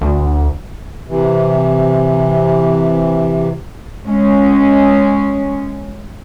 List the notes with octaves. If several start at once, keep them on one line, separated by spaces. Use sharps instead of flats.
D2
C3 E3
G#3 C#4